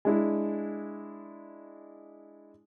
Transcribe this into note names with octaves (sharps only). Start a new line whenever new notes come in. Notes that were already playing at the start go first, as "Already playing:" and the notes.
G#3 D4 E4